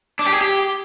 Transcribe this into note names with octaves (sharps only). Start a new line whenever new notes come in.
D4
G4
G#4
G4